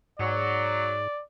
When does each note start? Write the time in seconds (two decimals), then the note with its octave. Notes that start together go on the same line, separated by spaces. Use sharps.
0.19 G#2 F#3 D5